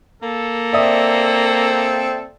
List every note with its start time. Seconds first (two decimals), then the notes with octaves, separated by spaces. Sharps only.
0.23 A#3 A4
0.73 C4 D5 E5 D#6